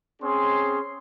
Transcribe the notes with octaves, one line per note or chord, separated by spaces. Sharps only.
C4 C#4 G#4 C6